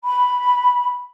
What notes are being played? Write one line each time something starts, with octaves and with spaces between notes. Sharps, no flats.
B5